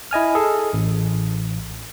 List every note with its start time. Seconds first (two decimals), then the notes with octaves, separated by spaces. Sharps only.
0.11 E4 D#5 G#5 F6
0.35 G#4 A4
0.73 A1